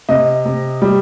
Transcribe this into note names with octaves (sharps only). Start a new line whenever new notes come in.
C3 D#5
C3
G3